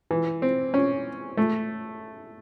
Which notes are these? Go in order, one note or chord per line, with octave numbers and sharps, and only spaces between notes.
E3
C4
C#4
A3